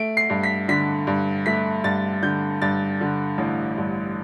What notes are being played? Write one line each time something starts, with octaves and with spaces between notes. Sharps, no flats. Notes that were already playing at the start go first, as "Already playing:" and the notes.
Already playing: A3 D7
C7
G2
B6
D3 B6
G2
A3 B6
G2 A6
D3 G6
G2 A6
D3
A1
G2